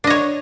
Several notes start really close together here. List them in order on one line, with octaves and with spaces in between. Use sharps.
D4 D#5 C#5